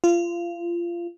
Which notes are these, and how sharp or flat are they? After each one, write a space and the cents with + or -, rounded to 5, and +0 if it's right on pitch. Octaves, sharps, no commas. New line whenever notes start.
F4 -25